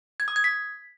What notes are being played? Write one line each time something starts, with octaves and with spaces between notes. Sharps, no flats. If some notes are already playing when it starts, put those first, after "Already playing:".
G#6
D#6
G#6
B6